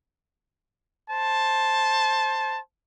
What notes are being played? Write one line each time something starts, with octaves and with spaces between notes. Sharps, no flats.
C5 A5